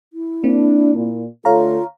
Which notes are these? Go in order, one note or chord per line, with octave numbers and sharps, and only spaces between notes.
E4
A#3 C4 D4
A#2
D3 A3 F4 A4 C#5 F5 A#5